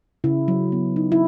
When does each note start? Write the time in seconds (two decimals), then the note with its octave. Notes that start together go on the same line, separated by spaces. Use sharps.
0.24 C#3 E4
0.48 F#3
0.72 B3
0.96 D#4
1.12 E4